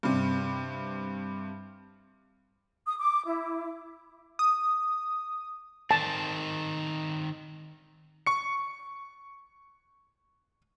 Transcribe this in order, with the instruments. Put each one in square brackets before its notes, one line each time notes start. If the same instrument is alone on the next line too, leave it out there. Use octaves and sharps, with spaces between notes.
[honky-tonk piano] G2 C3
[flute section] D#6
D6
E4
[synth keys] D#6
[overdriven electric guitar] D#3 C4 [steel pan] A5
[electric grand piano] C#6 C#7